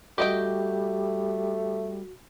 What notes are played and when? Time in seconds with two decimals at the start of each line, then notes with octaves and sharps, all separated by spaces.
0.18 G3 A3 F#4 G4 D#5 G5